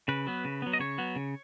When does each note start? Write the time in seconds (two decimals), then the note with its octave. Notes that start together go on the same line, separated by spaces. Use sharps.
0.08 C#3 B4
0.27 F#3 B3
0.45 C#3
0.62 F#3 B3
0.73 D#5
0.79 C#3 C#5
0.98 F#3 B3
1.16 C#3